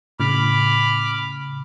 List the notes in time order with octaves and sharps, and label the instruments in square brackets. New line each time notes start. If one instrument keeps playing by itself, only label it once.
[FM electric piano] A2 C#3 [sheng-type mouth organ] B5 D6 F6